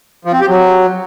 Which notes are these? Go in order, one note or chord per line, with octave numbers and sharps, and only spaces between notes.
F3
C4
G4
F#3